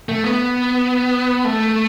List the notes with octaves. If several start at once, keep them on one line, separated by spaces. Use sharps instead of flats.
A3
B3
A3